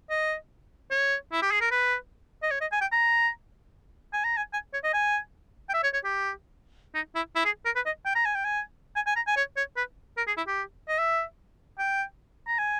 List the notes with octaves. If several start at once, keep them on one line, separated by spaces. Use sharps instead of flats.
D#5
C#5
E4
G4
G#4
A#4
B4
D#5
C#5
D#5
G#5
G5
A#5
G#5
A#5
G#5
G#5
C#5
D#5
G#5
G5
E5
C#5
C#5
G4
D#4
E4
E4
G#4
A#4
B4
D#5
G5
A#5
G#5
G5
G#5
G#5
G#5
A#5
G#5
C#5
C#5
B4
A#4
G#4
E4
G4
D#5
E5
G5
A#5
G#5